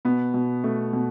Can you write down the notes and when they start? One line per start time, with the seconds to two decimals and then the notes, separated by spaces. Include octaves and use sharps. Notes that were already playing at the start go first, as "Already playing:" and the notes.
0.05 B2 B3
0.34 B2
0.64 B2 A3
0.93 B2